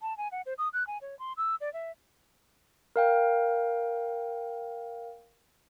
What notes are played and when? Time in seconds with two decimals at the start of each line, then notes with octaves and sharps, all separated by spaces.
0.01 A5
0.17 G#5
0.32 F#5
0.46 C5
0.58 D#6
0.73 F#6
0.87 G#5
1.01 C#5
1.19 C6
1.37 E6
1.60 D5
1.73 E5
2.96 A#4 F5 G5